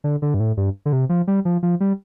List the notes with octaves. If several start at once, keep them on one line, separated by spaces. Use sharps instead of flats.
D3
D3
G2
A2
G2
D3
C3
F3
G3
F3
F3
G3